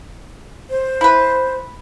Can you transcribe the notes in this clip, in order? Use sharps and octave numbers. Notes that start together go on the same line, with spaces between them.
C5
E4 B4